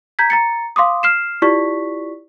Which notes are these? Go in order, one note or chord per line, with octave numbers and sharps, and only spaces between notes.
A#5 G6 G#6 B6
A#5 A6 C#7
F5 C6 D6 D#6
F6 C7 E7
E4 F4 G4 D5 C#6 B6